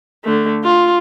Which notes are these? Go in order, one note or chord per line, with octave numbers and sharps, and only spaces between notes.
D3 A3
F4